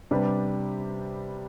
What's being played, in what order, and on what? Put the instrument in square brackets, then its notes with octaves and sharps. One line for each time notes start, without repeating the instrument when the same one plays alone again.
[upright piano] C3 G3 D4 G4 B4